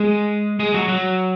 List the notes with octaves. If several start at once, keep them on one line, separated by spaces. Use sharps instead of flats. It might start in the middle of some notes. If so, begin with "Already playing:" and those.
Already playing: G#3 G#4
G#3 G#4
F#3 F#4
F#3 F#4